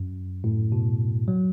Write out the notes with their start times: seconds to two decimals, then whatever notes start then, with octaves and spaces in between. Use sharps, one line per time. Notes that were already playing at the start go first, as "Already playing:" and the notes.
Already playing: F#2
0.44 A2
0.72 B2
1.28 F#3